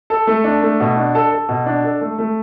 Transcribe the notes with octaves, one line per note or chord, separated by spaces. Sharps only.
A4
A3
D4
A3
B2
D4
A4
A4
B2
D4
A4
A3
A3